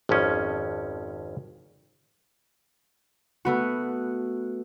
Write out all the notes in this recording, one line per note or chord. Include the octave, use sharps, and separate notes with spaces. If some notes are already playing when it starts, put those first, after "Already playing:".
G#1 F2 F3 C#4
A3 B3 F#4